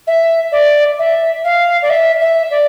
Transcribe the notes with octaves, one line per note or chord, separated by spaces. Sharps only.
E5
D5
E5
F5
D5
E5
E5
D5